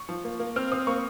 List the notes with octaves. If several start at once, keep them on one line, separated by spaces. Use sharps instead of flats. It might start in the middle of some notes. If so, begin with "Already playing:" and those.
Already playing: C#6
F3
A#3
A#3
C4 F6
C4 D#6
A#3 C#6